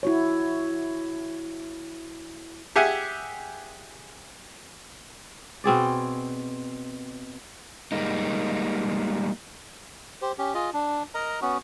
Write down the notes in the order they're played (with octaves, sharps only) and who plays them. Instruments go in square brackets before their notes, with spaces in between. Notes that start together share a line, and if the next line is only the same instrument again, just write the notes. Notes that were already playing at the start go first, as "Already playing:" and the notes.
[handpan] E4 F#4 C#5
[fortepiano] G4 G#4 E5 F#5 G#5
[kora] B2 C4 G#4 D5
[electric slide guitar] G3 G#3 A#3 D#4
[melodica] G4 C5
C#4 G4
F4 G#4 D#5
D4
A#4 D#5 A#5
B3 C#4 F#4